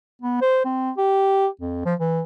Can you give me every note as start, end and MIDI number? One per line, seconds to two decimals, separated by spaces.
0.21 0.38 59
0.41 0.62 72
0.65 0.91 60
0.97 1.47 67
1.61 1.84 41
1.85 1.94 53
2.00 2.22 52